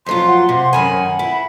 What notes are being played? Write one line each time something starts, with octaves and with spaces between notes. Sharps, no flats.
F2 F#3 F4 C6
F#5
C3
F#2 D#3 G#5 B5
E4